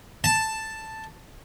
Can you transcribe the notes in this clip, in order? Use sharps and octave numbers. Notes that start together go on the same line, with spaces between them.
A5